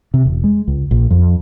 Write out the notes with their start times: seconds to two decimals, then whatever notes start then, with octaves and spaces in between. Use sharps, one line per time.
0.14 C3
0.25 E1
0.44 G#3
0.68 C#2
0.91 A#1
1.11 F2